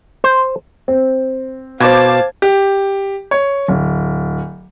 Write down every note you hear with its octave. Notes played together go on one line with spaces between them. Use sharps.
C5
C4
B2 C5 F5 A5 D6 G#6
G4
C#5
D1